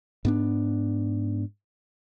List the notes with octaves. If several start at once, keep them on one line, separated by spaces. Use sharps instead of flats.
G#2 B3 D4